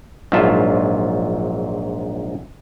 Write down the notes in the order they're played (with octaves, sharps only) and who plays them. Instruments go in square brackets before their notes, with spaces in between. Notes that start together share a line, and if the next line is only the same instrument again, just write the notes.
[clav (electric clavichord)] A#1 G#2 F#3 F4 E5 A5